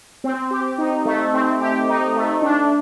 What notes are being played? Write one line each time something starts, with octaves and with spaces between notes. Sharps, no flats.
C4
G4
D#4
A3
C4
G4
D#4
A3
D4